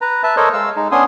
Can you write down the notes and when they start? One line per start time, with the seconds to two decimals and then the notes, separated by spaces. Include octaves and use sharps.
0.01 B4 A#5
0.23 B4 E5 A5
0.37 A4 A#4 C5 C#5 D#5
0.53 G#3 F5 E6
0.76 G#3 D#4
0.92 B3 C#4 D4 G#5 C6 D#6